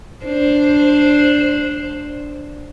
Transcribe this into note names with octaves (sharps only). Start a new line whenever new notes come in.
D4 C5